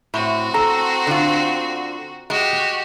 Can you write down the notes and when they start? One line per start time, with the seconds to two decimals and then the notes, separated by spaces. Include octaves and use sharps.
0.14 A2 C4 F#4
0.54 A4 A#5
1.07 D3 F4
2.30 G#3 F#4 G4